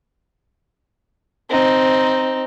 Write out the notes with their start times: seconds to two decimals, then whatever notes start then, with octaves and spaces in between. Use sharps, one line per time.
1.50 C4 D#4